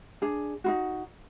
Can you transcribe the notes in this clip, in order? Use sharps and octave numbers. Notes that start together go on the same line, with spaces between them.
D4 G#4
D#4 F4 F#4